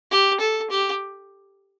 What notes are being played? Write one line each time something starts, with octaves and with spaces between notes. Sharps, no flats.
G4
A4
G4